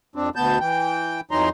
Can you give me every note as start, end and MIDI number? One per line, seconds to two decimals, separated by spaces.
0.16 0.29 41
0.16 0.29 60
0.16 0.29 62
0.36 0.59 38
0.36 0.59 47
0.36 0.59 59
0.36 0.59 81
0.36 0.59 91
0.60 1.21 52
0.60 1.21 79
1.31 1.49 41
1.31 1.49 52
1.31 1.49 54
1.31 1.49 63
1.31 1.49 82
1.31 1.49 84